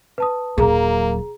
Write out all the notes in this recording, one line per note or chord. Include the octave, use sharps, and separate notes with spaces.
B4 A5 D#6
D#1 F#3 A#3 G#4 A#5